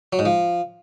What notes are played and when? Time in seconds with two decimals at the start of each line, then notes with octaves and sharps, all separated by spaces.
0.13 F#3
0.19 G#2
0.25 F3